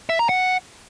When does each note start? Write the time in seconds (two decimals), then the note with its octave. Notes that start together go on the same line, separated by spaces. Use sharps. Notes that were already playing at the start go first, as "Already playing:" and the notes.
0.09 E5
0.19 A#5
0.29 F#5